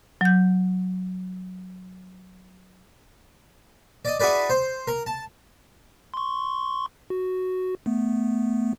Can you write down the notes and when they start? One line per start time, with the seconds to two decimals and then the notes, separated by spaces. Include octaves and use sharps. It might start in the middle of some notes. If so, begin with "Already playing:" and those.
0.21 F#3 G6
4.05 D5 D#5
4.20 E4 F#4 G#4 B4 D5
4.50 C5
4.87 A#4
5.06 A5
6.14 C6 C#6
7.10 F#4
7.86 A3 B3